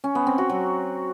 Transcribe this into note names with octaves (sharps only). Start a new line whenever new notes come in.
C#4
B3
C4
F#4
F#3